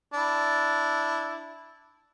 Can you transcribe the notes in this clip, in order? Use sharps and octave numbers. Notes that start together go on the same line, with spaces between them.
D4 E4